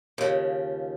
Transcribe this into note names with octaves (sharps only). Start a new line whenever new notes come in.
D#2 C#3 F3